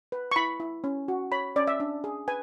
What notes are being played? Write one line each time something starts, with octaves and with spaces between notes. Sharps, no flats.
B4
C#6
E4 B5
E4
C#4
F#4
C#5 B5
C#4 D5
E5
D4
G#4
B4 G#5